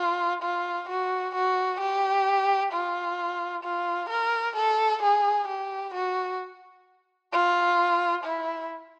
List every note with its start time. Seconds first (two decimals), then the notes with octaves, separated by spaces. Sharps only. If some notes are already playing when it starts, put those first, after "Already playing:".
Already playing: F4
0.42 F4
0.89 F#4
1.35 F#4
1.80 G4
2.72 F4
3.64 F4
4.10 A#4
4.56 A4
5.03 G#4
5.48 G4
5.94 F#4
7.32 F4
8.24 E4